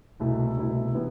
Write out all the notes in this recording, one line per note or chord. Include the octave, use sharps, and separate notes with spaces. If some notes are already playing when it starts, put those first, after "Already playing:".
C2 B2 A3 E4
C2 B2 A3 E4
C3 E3 B3